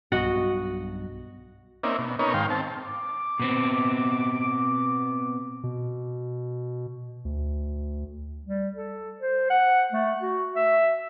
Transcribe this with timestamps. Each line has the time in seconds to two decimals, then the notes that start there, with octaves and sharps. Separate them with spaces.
0.12 B1 G2 B2 F#4 D#5 F#5
1.83 A#3 C4 C#4 D#4 D5 E5
1.98 B2
2.19 B3 C#4 D#4 A#4 C#5
2.34 G#2 D#3 F5 G5 C6
2.50 C4 A5
2.81 D6
3.39 B2 B3 C4
5.63 B2
7.25 D2
8.45 G3
8.76 A4
9.21 C5
9.50 F#5
9.92 A3
10.22 F#4
10.56 E5